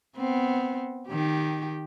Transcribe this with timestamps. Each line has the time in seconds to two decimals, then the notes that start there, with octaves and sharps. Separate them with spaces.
0.17 B3 C4
1.08 D#3 G4